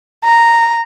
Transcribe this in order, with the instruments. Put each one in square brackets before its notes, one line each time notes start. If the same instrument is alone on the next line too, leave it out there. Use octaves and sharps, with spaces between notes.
[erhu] A#5